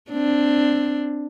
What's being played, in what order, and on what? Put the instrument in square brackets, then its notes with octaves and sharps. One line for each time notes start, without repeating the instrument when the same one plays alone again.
[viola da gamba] C4 D4